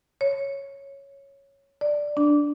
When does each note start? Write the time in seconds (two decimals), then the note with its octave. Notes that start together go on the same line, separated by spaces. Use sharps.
0.21 C#5
1.81 D5
2.17 D4